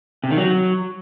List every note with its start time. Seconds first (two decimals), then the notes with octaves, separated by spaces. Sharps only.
0.24 C3
0.31 D#3
0.37 F#3